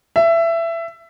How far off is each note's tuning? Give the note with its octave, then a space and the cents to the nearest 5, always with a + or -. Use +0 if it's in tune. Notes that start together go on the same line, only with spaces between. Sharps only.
E5 +20